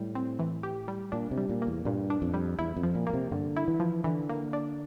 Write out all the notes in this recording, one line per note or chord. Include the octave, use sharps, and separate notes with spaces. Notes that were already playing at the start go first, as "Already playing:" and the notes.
Already playing: A2 G3
C4
E3
G4
G3
A#2 D4
C3
G3
A#2
A#3
E2
G2 A#2
D4
F2
G3
E2 E4
F2
F3
A#2
A#2 A#3
C3
G2 D3
E4
E3
F3
D3 E3
A#3
D4